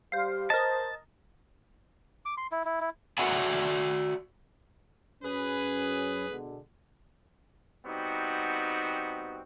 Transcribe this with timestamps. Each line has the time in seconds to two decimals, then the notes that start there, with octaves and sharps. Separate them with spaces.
0.12 G3 G4 C5 F5
0.50 A#4 C5 D#5 A5
2.25 D6
2.37 C6
2.52 E4
2.65 E4
2.81 E4
3.18 F#4 D5 E5 F#5 G#5
5.23 F#2 C#4 G#4 B4
6.29 B2 D3 G#3
7.86 G3 B3 C4 D#4 F#4